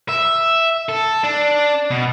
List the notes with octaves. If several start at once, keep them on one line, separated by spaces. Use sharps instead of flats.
E5
A4
D4
B2